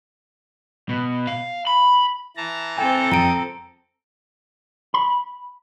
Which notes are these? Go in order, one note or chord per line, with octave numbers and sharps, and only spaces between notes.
B2
F5
B5
E3 A5 A#5
C4 A4 G5 G#5
F2 G5 A#5 D#6 D7
B5